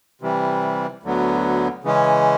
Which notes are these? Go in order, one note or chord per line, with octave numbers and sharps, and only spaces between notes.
C3 E3 G3
D2 D3 F#3 B3
C#3 E3 G#3 C#4